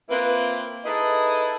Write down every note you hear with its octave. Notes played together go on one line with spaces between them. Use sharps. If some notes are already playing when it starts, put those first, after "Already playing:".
A#3 C4 E4 F4 B4
D#4 E4 G#4 A4 B4 D#5